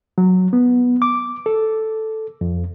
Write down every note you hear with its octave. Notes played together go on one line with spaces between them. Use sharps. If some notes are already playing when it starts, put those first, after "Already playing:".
F#3
B3
D6
A4
F2